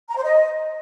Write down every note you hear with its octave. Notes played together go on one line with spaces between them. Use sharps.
A#5
C5
D#5